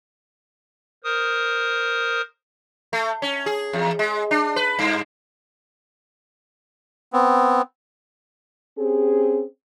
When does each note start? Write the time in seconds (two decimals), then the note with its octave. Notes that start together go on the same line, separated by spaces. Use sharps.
1.04 A#4 C5 D#6
2.93 A3
3.22 C#4
3.46 G#4
3.73 E2
3.99 G#3
4.31 D4
4.56 B4
4.79 G2
7.13 B3 C4
8.77 C4 C#4 G4 G#4